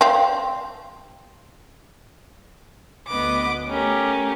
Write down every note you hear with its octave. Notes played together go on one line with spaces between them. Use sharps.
C4 F5
D2 B3 B4 D#5 D6
A3 C#4 G4 A#4